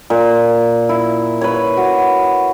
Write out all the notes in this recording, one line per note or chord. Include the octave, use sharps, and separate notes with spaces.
A#2
E4
B4 C#5
F#4